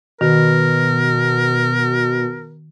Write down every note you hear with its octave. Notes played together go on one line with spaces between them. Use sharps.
B2 D#3 A#4